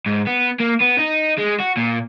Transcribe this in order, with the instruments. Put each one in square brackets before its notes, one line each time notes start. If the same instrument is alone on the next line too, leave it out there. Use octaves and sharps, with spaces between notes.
[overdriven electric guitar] G#2
B3
A#3
B3
D#4
G#3
F#4
A#2